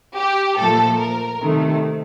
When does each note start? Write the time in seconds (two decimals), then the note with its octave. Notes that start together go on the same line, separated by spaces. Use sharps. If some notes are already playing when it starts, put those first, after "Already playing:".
0.16 G4
0.58 A#2 F3 A3 A4
0.99 A#4
1.41 C3 D#3 A3